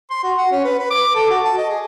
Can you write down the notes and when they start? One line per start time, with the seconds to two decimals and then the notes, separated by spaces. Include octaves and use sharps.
0.11 C6
0.23 F#4
0.38 F#5
0.51 C#4
0.64 B4
0.79 B4
0.90 D6
1.15 A4
1.30 F#4
1.45 A5
1.58 D#5
1.70 G#4